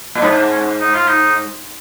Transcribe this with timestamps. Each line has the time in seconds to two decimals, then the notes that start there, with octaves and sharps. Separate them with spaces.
0.15 A#2
0.21 G#2 B3
0.51 C#4
0.80 D#4
0.94 F4
1.08 D#4